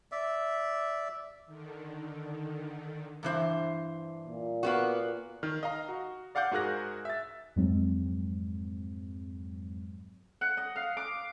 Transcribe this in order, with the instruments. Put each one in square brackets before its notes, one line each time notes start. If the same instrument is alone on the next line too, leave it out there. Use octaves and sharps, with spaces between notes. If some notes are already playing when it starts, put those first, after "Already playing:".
[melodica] D5 E5
[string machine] D3 D#3
[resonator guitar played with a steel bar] G2 E3 C5
[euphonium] A#2
[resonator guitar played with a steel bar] A#3 B3 F#4
[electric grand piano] D#3 F6
D#5 F5 A#5
F#4
D5 F5 F#5 D6 G6
G#2 F#4 G#4 A#4 F#6 A#6
E5 A6
[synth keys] F2 G#2 F#3 G#3 C4
[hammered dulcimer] F#5
D#5
F5
D6